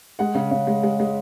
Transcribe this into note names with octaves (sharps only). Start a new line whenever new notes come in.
G#3 F#5
C#3
C#3
G#3
G#3
G#3